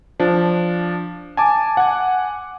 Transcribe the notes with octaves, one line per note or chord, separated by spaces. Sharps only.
F3 D4
G#5 A5 D6
F#5 G#5